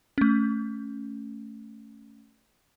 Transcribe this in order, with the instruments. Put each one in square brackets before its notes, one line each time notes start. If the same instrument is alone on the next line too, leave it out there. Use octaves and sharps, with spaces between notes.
[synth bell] A3 C#4